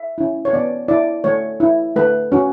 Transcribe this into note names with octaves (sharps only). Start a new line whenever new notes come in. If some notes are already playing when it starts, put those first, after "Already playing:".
Already playing: E5
C#4 E4
C#5
B3 D5
E4 D5
A3 C#5
E4
A3 B4
C#4 F#4